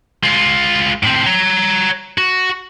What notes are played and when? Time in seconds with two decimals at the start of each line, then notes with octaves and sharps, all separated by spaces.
0.23 G#3 F4
1.03 A2 C4
1.26 C#5 A#5
2.18 F#4